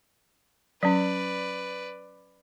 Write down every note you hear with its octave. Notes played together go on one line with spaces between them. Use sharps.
F#3 C#4 B4 D5